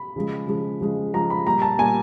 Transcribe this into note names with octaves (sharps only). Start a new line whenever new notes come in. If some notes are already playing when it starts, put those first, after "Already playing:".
Already playing: B5
C#3 F3 G#3
C#3 F3 G#3
C#3 F3 G#3
C#3 F3 G#3 A#5
B5
A#2 G3 A#5
A5
A#2 G3 G#5